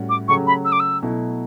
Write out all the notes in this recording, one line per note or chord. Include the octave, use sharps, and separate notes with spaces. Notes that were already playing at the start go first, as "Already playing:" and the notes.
Already playing: A2 G3 C#4 F#4
D6
C#3 F#3 A3 C#4 G4 C#6
B5
E6
D6
E6
B2 F#3 A3 E4